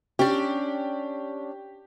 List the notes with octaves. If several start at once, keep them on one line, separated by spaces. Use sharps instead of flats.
C#4 D4 G4